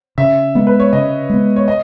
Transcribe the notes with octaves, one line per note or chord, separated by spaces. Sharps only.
C#3 E5
G#3 B3
B4
C#5
C#3 D#5
G#3 B3
C#5
D#5